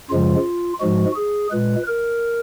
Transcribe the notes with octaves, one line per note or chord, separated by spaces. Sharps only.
F#2 C#3 F3 G#3 F4
G#2 F3 G#3 F#4
G#4
A#2 G#3 B4
A#4